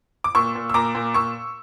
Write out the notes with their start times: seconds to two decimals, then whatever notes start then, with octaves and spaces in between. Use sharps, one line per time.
0.24 D6
0.35 A#2 C#6 E6
0.55 A#2
0.70 E6
0.74 A#2 A#5 D6
0.95 A#2
1.14 A#2 C#6 E6